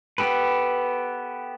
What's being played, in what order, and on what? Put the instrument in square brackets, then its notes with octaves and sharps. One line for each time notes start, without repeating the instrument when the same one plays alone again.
[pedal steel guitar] B3 G4 A4 B4